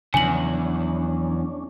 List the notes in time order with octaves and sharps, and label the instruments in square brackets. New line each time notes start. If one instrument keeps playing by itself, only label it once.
[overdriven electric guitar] E2 [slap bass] C#3 F3 F#3 [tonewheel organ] C#4 D4 [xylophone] G#5 F#7